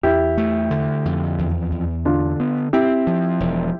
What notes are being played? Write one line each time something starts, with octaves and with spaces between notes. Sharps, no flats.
E2 E4 G4
A3
D3
F2
E2
E2
D3 D4 F4
B3
C4 E4 G4
F3
E1